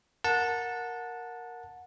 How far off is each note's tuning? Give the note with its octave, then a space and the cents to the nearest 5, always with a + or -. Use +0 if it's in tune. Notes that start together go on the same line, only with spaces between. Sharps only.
A#4 +0 F#5 -20 A5 +0